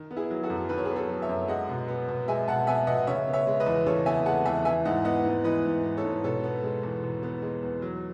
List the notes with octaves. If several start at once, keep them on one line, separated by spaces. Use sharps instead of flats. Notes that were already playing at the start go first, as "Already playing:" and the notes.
Already playing: D#3
B3
E4 G#4
F#3
F#4 A4
F#2
D#3 B4
C#5
G#4 B4
B3
A4 C#5
F#3
C#5 E5
F#2
G#3 D#5 F#5
B2
B3
B2
G#3 E5 G#5
B2 F#5 A5
B3 E5 G#5
B2 D#5 F#5
C#3 C#5 E5
B3
C#5 E5
G#3
B4 D#5
E2
C#3 A4 C#5
B3 E5 G#5
G#3 F#5 A5
E2 E5 G#5
E3 E5 G#5
G#2 D#5 F#5
B3 D#5 F#5
G#2
E3 B4 D#5
G#2
B3
A4 C#5
G#2
B2 A4 C#5
B3
G#3
E2
B2
B3
G#3
E2
F#3